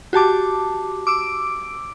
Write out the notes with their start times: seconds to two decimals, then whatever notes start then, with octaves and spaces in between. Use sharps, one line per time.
0.13 F#4 G4 A5 D6
1.07 D6 E6 D7